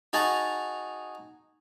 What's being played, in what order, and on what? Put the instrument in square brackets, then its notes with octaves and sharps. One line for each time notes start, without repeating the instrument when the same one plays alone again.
[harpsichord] D#4 F#4 G#4 A5 A#5